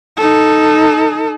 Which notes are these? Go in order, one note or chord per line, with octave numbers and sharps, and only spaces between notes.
D#4 A4